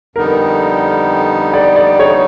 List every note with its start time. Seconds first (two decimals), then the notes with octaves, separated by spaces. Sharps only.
0.16 F2 D3 G3 B3 D#4 A#4
1.53 D5
1.76 D5
1.99 C#5